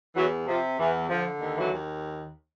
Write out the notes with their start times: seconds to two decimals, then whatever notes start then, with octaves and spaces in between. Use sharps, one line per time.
0.15 E2 E3 F#3
0.47 C3 F3
0.79 E2 E3
1.09 D3 F3
1.40 D#2
1.56 E3 F#3
1.72 D#2